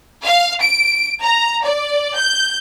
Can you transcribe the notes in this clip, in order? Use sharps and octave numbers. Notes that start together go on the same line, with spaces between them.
F5
D7
A#5
D5
G6